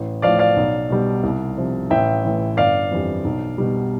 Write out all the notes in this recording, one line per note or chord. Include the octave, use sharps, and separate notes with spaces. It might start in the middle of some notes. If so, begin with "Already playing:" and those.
Already playing: A1
A2 F3 D5 F5
D5 F5
B1
B2 G3
C2
C3 F3
A1 E5 G5
A2 E3
G1 D5 F5
F2 E3 G3
B1
B2 G3